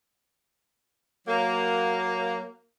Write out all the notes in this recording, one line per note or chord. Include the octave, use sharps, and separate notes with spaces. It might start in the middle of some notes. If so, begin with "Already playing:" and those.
F#3 A#3